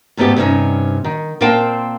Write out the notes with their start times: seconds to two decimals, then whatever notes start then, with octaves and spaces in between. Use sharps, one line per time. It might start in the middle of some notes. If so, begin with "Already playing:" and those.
0.17 E2 G#2 A3 B3 G4
0.36 G2 C3 C4 C#4 D#4
1.04 D#3
1.41 A#2 C4 A#4 F5 G5 A5